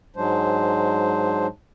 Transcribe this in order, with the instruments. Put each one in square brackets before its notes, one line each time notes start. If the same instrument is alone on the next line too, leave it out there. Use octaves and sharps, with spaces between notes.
[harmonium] G#2 F#3 G#3 D4 C5